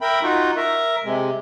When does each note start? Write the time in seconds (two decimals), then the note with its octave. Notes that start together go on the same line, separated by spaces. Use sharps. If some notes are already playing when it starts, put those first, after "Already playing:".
0.01 A#4 E5 G5 B5
0.23 D#4 F4 F#4
0.57 A#4 E5
1.04 C3 G#3